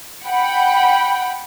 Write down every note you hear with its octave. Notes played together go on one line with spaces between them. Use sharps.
F#5 G5 B5